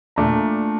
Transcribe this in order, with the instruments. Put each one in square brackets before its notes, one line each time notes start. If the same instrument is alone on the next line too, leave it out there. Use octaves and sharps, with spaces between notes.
[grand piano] A#2 A3 D4 A#5 D6